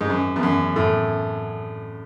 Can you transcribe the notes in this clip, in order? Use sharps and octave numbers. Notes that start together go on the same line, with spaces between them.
G#2
F#2
E2
F#2
A2